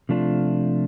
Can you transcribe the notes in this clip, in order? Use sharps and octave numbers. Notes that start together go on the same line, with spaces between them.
C3 F3 A3 D4 F4